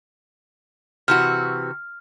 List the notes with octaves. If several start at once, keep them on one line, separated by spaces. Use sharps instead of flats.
C3 E3 F#4 F6